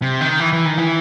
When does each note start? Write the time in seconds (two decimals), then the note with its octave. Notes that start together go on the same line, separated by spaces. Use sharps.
0.02 C3
0.21 D#3
0.40 E3
0.53 E3
0.65 D#3
0.78 E3